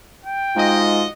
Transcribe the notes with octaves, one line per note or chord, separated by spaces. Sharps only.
G5
G#2 F4 F#4 D#5